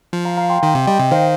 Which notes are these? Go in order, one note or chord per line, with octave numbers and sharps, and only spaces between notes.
F3
F5 A#5
F5 A#5
G5 C6
D#3 G5 C6
C3
G3 D#5 G5
C3
D#3 C5 F5